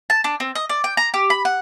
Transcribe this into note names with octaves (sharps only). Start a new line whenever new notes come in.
A5
D4
C4
D#5
D5
G5
A#5
G4
B5
F#5